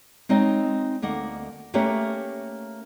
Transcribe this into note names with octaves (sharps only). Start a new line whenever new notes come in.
G#3 C4 D#4 C#5 D#5
D2 A#3 D#5 F#5
A3 A#3 C#4 G4 B4 C#5